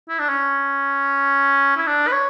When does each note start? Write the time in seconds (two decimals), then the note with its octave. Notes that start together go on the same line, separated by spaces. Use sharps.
0.09 E4
0.19 D4
0.29 C#4
1.76 E4
1.87 D4
2.07 B4
2.12 C#5